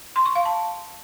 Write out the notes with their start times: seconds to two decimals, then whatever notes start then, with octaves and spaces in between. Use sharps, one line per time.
0.16 C6
0.26 C#6
0.35 F5
0.45 A5